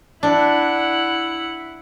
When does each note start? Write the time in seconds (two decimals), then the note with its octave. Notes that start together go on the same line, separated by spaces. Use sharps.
0.23 D4 E4 F#5